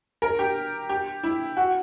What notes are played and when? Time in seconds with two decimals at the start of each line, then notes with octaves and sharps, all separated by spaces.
0.22 A#4
0.39 G4
0.89 G4
1.23 E4
1.57 F#4